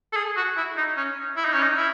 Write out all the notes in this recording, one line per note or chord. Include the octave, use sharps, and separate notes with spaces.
A4
G#4
F#4
E4
D#4
C#4
E4
D#4
C#4
D#4
E4